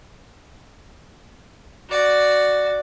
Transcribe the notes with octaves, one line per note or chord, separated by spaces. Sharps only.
F#4 D5